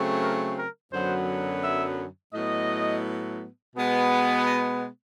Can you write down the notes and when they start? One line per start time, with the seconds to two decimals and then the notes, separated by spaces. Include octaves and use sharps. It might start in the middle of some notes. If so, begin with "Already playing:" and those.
Already playing: C#3 F#3 A3 C4
0.22 A#4
0.58 A#4
0.92 F#2 D3 F#3 B3 C5
1.63 E5
2.33 A2 F#3 B3 D#5
3.75 B2 G#3 B3
4.45 D#5